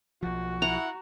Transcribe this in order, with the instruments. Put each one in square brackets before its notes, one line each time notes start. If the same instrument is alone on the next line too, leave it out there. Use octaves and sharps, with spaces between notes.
[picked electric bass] B1 F3 [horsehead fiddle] F#4
[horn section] E4 F#5 [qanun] A#5